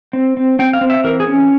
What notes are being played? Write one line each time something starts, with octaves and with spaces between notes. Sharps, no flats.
C4
C4
C4 G5
F5
C4
E5
E3 A#4
G#4
C#4